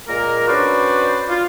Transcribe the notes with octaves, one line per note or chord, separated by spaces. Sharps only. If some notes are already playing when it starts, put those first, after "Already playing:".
A#2 G#3 A#3 A#4
C#4 D4 F#4 B4 C5 D5
F4